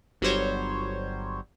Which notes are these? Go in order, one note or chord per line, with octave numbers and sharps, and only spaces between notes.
G1 F#3 G3 C5 C#5